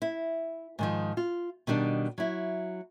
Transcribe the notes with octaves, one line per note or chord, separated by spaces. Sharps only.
E4
G#2 D#3 F3
F4
B2 D#3 G3 D4
F#3 E4